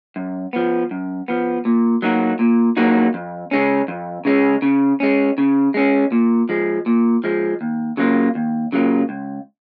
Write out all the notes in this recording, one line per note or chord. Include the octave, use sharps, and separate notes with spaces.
F#2
F3 B3
F#2
F3 B3
A#2
F#3 A#3 D#4 F#4
A#2
F#3 A#3 D#4 F#4
F2
C#3 G#3 C#4
F2
C#3 G#3 C#4
C#3
G#3 C#4
C#3
G#3 C#4
A#2
F3 G#3
A#2
F3 G#3
D#2
C#3 F#3 A#3 F4
D#2
C#3 F#3 A#3 F4
C#2